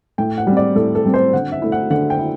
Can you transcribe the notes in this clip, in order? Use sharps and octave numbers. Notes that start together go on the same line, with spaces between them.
A2 G5
F#5
G3 C4
D5
A2 A4
A4
G3 C4
C5
D3 F#5
E5
A3 E4
F#5
D3 F#5
G5
E4